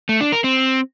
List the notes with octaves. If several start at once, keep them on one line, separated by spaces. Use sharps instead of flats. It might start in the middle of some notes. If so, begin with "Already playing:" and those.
A3
D4
A#4
C4